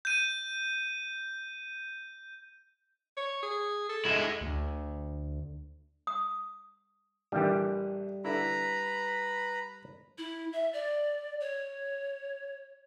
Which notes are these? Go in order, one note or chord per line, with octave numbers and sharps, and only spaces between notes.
G6 D#7
C#5
G#4
A4
G#3 E4
D2
D#6
A#1 E3 G3 A3 G4
D3 E4 B4 A#5 B5
E4
E5
D5
C#5